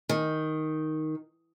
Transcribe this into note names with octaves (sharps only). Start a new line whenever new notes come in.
D#3